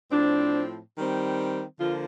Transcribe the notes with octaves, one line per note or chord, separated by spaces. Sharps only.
A2 F3 C4 D4
D#3 G3 C4
D3 F3 A#3 F4